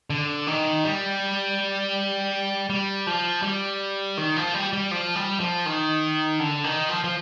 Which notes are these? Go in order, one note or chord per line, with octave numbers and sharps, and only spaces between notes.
D3
D#3
G3
G3
F3
G3
D#3
F3
G3
G3
F3
G3
F3
D#3
D3
D#3
F3
F3